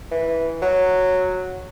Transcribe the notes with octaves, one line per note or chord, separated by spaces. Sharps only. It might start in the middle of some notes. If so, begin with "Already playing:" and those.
E3
F#3